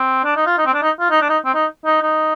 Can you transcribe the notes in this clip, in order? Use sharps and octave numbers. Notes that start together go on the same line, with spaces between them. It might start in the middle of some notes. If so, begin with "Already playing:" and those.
Already playing: C4
D4
D#4
F4
D#4
C4
D4
D#4
F4
D#4
D4
D#4
C4
D#4
D#4
D#4